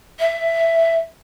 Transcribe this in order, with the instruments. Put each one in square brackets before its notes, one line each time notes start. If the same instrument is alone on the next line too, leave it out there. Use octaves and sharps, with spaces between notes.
[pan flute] E5